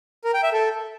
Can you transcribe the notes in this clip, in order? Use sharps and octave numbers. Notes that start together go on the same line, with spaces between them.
A#4
G5
E5
A4